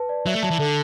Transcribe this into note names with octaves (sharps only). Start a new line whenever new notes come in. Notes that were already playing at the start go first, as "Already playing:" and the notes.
Already playing: B4 A5
D5
F#3 E5
A3
F#3 A5
E3
D3 A4